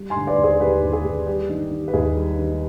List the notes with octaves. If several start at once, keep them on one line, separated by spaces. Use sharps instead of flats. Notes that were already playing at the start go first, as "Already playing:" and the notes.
Already playing: G3
G#5 C6
D3
B4 D5
D#2
G#4 C5
D#2 G4 B4
D#2
G#4
D#2
G3 G4
D#3
D#3
B4
D#2 G#4
G3
D#3